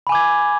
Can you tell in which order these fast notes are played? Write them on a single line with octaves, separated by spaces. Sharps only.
B5 G#5 D6 G#6